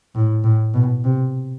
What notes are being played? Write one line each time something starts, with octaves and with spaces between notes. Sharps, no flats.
A2
A2
B2
C3